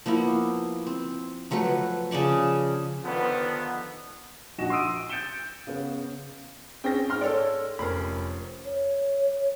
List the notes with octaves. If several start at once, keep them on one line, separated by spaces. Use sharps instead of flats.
F3 A#3 B3 E4
C4
F3 F#3 A3 B4
C#3 F3 D5 C#6
D3 D#3 F3 B3
A#1 D#4 F#4 A#6 E7
C6 D#6 E6 D7 D#7
G6 A6 C#7 D7 E7 G7
C#3 B3
C4 C#4 G#4 G5 A#6
G#2 C6 F6
A4 C#5 D5
F1 C#4 A#4 C5 B5
C#5